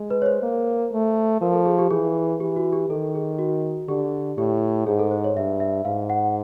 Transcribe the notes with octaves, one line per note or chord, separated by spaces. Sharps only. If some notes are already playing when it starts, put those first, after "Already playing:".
Already playing: G#3
B4
C#5
C5
A#3
A3
F3 A#4
A4
G#4
G4
E3 G#4
E3 G4
F#4
G4
D#3 A4
G#4
F#4
D3 G4
A2 G4
G#2 G#4
A4
C5
C#5
G2 E5
E5
G#2 F5
F#5